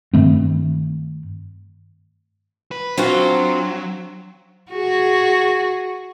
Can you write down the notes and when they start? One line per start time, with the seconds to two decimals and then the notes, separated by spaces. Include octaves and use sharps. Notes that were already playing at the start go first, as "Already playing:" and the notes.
0.13 G2 D#3 A3 C4
2.71 B4
2.98 F#3 C4 D4 F4 F#4 F5
4.71 F#4 G#4